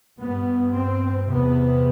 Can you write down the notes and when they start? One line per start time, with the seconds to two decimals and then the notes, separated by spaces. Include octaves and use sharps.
0.20 G2 B3
0.74 C4
1.27 E2 C3 B3